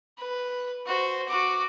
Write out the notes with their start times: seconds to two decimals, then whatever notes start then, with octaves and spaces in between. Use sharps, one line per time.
0.18 B4
0.86 F#4 C5
1.28 F#4 D6